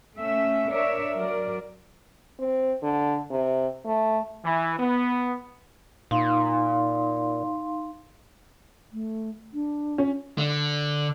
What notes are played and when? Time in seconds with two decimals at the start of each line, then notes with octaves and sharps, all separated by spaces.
0.16 A3 C#4 E5
0.70 D4 A#4 C#5 D5 E5
1.16 F#3 A#4 D5
2.40 C4
2.83 D3
3.30 C3
3.85 A3
4.45 E3
4.79 B3
6.11 A#2 D#4 F5 C6
8.93 A3
9.54 D4
9.98 C#4
10.38 D3